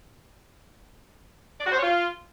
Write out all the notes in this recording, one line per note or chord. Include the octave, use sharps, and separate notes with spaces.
D5
F#4
C5
C#5
F4